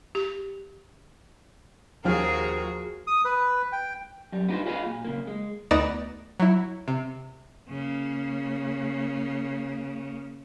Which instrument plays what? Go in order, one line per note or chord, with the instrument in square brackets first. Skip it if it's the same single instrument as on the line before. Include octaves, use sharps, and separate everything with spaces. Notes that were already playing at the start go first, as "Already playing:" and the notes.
[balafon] G4
[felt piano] D#2 F3 F6 [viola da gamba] F#4 G#4 A#4
[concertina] D#6
B4
G5
[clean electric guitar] F#2 G3
B3 D4 D#4 F4 B4 C5
F4 F#4 G#4 B4 D#5 F5
A#2
C#3 A#3
G#3
[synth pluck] D2 B3 D#4 D5 A#5 E7
F#3 E4
C3
[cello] C#3 A#3